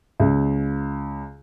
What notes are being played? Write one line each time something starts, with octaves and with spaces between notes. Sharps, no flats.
C#2